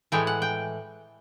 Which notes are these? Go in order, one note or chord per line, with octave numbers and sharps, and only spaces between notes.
A2 E3 G#3 G5
F#5
G5